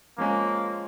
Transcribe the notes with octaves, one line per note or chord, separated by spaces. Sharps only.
F3 G#3 A#3 C#4